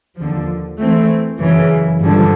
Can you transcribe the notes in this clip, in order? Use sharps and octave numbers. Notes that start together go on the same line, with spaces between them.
D#2 D3 F3
E3 A3 C4
F#2 C#3 E3
G2 D3 F3